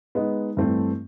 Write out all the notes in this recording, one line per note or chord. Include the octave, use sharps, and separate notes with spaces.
G#3 B3 D#4
G2 E3 A3 C4